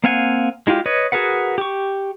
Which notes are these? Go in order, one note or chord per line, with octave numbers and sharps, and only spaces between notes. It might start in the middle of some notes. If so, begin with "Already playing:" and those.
A#3 C4 F5 F#5 G#5
G#3 E4 F4 G4
B4 C#5 D#5
F#4 G#4 A#4 B4 F#5
G4 C#6